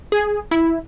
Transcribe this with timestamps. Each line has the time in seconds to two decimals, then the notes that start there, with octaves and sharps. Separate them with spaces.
0.12 G#4
0.51 E4